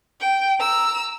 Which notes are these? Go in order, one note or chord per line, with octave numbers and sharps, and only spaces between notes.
G5
A#5 E6